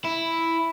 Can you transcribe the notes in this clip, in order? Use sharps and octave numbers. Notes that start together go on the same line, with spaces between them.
E4